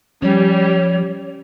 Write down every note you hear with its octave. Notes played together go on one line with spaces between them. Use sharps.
F3 G3 C#4 C#5